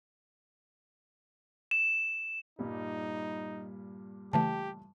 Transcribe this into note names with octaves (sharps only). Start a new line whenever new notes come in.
E7
G2 A#2 G3 D#4
C#3 E3 A3 G4 A5